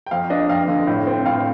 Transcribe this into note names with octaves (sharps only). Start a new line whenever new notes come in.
G5
F2 F5
D4 D#5
F2 F5
D3
A2
C4
A2 F5